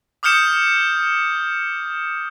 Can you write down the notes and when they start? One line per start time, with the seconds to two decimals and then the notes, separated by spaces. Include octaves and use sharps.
0.23 D6 D#6 F6 G6 C#7 E7